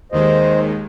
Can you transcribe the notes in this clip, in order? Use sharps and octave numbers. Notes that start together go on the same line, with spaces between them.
D#2 D#3 G#3 C5 D#5